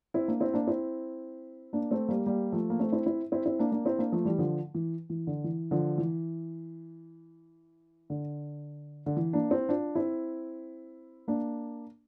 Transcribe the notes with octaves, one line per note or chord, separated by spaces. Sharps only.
C4 E4
A#3 D4
C4 E4
A#3 D4
C4 E4
A#3 D4
A3 C4
G3 A#3
G3 A#3
F3 A3
A#3
A3 C4
C4 E4
C4 E4
C4 E4
C4 E4
A#3 D4
A#3 D4
C4 E4
A#3 D4
F3 A3
E3 G3
D3 F3
E3
E3
D3
E3
D3 F3
E3
D3
D3
E3
A#3 D4
C4 E4
D4 F4
C4 E4
A#3 D4